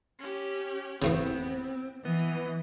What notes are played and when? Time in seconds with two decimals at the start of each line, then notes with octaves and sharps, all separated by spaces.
0.19 C#4 G4
1.02 E2 A2 C#3 B3 C4
2.05 E3 B3 D#5